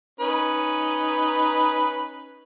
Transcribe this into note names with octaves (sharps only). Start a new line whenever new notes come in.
C#4 D#4 B4